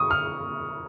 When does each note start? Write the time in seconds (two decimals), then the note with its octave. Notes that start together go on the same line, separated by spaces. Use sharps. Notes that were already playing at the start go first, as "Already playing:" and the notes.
Already playing: C#6 D#6
0.11 F6